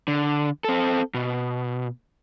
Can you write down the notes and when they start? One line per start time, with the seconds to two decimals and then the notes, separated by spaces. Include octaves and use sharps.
0.08 D3
0.64 C4 A4
1.14 B2